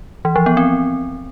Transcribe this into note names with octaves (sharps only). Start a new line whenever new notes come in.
E3
F3
B3
C4